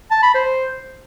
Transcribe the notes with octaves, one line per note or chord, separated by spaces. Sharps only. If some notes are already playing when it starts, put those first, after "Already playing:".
A5
B5
C5